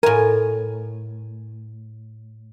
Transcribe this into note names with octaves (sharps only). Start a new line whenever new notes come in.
A2 A#4 G#5